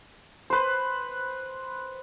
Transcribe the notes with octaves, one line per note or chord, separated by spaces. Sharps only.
B4 C5